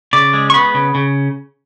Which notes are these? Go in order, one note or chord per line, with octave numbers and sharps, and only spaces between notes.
C#3 D5
G#3
C#6
B3 B5
C#3
C#3